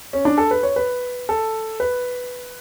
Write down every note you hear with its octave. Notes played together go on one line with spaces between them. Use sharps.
C#4
D4
A4
B4
C#5
B4
A4
B4